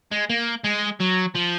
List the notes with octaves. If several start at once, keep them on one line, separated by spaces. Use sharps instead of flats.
G#3
A#3
G#3
F#3
F3